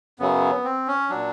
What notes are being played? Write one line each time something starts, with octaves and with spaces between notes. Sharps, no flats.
F#2 C#3 F#3 B3
C4
C#4
A#2 F#3 D4